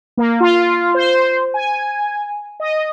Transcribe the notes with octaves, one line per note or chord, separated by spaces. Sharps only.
A#3
F4
C5
G#5
D#5